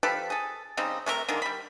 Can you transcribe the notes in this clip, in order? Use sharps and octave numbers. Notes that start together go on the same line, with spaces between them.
F3 G4 A4 B4
G#4 A4
C#3 G3 C4 D#4
C3 A3 C#4 A#4
D3 D#3 G#3 A#3
G3 B5